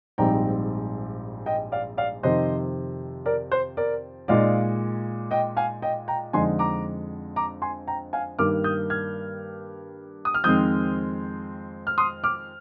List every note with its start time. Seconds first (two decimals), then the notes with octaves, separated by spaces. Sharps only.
0.18 A#1 G#2 G3 C4 D#4 G5 A#5
1.46 D#5 G5
1.72 D5 F5
1.97 D5 F5
2.23 F2 C3 D#3 C5 D#5
3.26 A#4 D5
3.52 C5
3.77 A#4 D5
4.28 A#2 G#3 D#4 D5 F5
5.31 D#5 G5
5.57 F5 G#5
5.82 D#5 G5
6.08 G5 A#5
6.33 F2 D3 G#3 D#4 G#5 C6
6.59 A#5 D6
7.36 A#5 D6
7.62 G#5 C6
7.87 G5 A#5
8.13 F5 G#5
8.39 G2 D#3 A#3 D6 F6
8.64 D#6 G6
8.90 F6 G#6
10.25 D#6
10.34 F6
10.44 F2 D#3 G#3 C4 D#6 G6
11.87 F6
11.98 C6 D#6
12.24 D6 F6